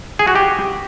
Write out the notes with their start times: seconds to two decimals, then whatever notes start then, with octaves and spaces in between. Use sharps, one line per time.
0.19 G#4
0.27 F#4
0.36 G4